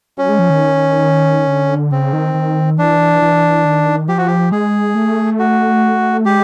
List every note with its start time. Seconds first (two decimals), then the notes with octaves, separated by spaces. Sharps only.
0.17 F#3 C#4
0.29 G#3
0.39 F3
0.50 D#3
1.48 D3
1.91 C#3 C4
2.13 D#3
2.34 D#3
2.78 E3 D4
3.22 E3
3.65 D#3
4.08 F3 G4
4.18 F#4
4.27 G4
4.52 G#3 G#4
4.95 A3
5.39 F#4
6.25 G#3 G4